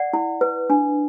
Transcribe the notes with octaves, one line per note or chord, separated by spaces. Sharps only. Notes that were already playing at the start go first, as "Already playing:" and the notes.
Already playing: D5 F#5
E4
B4
D4